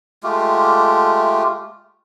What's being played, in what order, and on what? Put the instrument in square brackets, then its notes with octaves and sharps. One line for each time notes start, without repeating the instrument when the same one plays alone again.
[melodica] G#3 A3 F4 G4